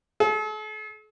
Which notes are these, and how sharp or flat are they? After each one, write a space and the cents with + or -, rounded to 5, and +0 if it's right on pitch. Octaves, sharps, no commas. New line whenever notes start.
A4 -45